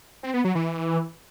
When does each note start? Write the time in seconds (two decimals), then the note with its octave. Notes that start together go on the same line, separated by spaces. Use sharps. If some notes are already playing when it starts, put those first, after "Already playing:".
0.23 C4
0.34 B3
0.44 F#3
0.55 E3